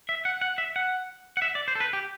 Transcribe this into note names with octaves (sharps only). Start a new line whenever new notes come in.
E5
F#5
F#5
E5
F#5
F#5
E5
D5
C5
A4
B4
G4